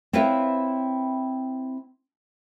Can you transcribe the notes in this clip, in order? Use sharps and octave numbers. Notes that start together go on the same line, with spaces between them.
C4 E4 F4 B4 C#5 E5